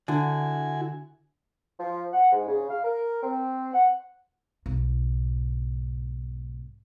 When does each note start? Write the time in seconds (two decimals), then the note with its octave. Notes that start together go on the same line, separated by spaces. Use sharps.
0.08 D3 E4 F#4 G#5
1.79 F3
2.13 F#5
2.31 G#2
2.47 C#3
2.69 F5
2.84 A#4
3.23 C4
3.73 F#5
4.66 B1 G#2